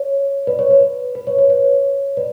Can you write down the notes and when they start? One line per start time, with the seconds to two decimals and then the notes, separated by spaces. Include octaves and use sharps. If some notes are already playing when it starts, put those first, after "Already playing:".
Already playing: C#5
0.47 B4 D5
0.59 C#5
0.71 B4
1.15 B4
1.27 C#5
1.39 B4
1.50 C#5
2.17 B4 D5